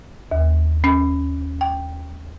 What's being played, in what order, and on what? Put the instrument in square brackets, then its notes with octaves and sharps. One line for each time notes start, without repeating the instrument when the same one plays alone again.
[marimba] D#2
C#4
G5